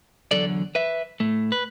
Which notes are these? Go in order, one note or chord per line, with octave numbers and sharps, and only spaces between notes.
E2 D3 F#3 A4 D5
B4 E5
A2 A3
B4